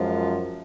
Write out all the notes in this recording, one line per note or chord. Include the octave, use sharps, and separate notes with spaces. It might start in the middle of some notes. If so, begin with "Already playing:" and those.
Already playing: F#2 F3 G#3